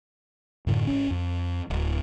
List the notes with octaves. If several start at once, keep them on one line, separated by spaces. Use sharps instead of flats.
F#2 A2 D3
G#1 C#4
F2
D1